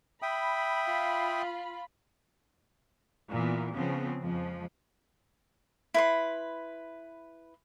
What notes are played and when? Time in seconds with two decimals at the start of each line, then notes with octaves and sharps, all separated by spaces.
0.22 E5 G5 B5 D#6
0.87 F4 B5
3.29 A#2 E3 B3
3.72 C#3 F3 B3 C4
4.20 F2 F3 G#3
5.94 E4 B4 C6